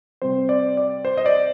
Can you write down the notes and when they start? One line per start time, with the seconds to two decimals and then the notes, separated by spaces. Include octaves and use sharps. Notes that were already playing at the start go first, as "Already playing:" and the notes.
0.22 C3 G3 C4 C5
0.49 D5
0.77 D5
1.05 C5
1.18 D#5
1.26 D5